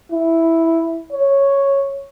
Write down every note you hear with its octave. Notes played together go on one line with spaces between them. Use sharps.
E4
C#5